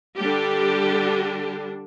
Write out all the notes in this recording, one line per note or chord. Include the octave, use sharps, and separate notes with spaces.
D3 G3 D4 G4